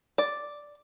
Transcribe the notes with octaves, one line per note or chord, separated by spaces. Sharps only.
D5